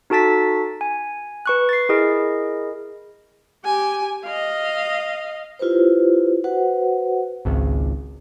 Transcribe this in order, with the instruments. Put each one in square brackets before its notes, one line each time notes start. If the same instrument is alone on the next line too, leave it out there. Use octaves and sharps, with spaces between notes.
[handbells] D#4 F#4 A4 A5 A6 B6
G#5
B4 C#6 F#6
A6 C7
E4 G#4 A#4 D#5
[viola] G4 G#5
D#5 F5
[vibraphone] E4 F4 G4 B4 C5
F#4 B4 C5 F#5
[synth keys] G#1 C#2